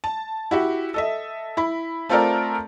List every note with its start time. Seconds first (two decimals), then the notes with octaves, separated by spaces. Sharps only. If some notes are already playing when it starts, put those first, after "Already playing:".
0.04 A5
0.51 E4 F#4 G4
0.94 A4 D#5 E5
1.57 E4 B5
2.09 A3 C4 F4 A4 A#4 D5